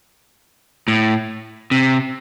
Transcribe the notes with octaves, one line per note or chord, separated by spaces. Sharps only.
A2
C3